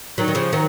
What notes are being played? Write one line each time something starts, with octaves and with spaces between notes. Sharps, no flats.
D#3 F#3
D#3
C#3 F3
D#3 F#3